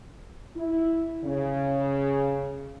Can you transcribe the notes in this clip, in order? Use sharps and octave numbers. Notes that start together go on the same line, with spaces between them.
E4
C#3